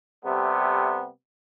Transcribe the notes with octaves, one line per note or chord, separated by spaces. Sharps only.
C3 G3 A3 B3